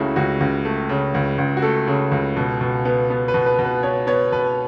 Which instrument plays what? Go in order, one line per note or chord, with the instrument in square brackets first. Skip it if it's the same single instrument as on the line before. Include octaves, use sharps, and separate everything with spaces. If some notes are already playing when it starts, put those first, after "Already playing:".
Already playing: [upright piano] C#2 C#3 A3 E4 F#4
C#2 F#4
C#2
A3
C#3
C#2
C#2
F#4
A3 A4
C#3
C#2
B2
B2
B3
B3
B4
B2
B4
B2
B4
B3 C#5
B3 C#5
B2 B4